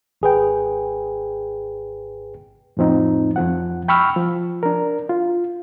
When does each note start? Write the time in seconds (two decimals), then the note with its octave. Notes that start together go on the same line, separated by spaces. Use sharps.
0.22 G#1 G#4 B4 G5
2.77 F2 A2 F3 C4 D#4
3.36 F2 F3 F#5
3.88 G5 B5 C#6 E6 F6
4.16 F3
4.63 D4 A#4
5.09 F4